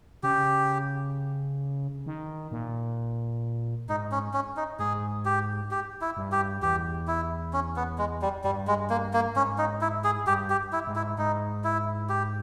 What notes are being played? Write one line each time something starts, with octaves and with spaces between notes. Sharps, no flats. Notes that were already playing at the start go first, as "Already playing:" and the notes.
C#3 G4
D#3
A#2
G#2 D#4
C#4
C#4
D#4
G#2 G#4
G4
G4
E4
G2
G4
E2 G4
E4
C#4
B3
G#3
G3
G2 G3
G#3
A#3
A#3
G#2 C#4
D#4
E4
G#4
G2 G4
G4
E4
G#2
E4
G#2 D#4
E4
G4